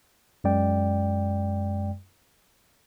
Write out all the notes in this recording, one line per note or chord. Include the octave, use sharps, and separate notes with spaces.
F#2 G#3 D5 G5